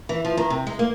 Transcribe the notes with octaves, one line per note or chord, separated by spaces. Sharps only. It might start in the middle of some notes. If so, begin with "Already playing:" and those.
E3
F3
D#3
C3
G#3
A#3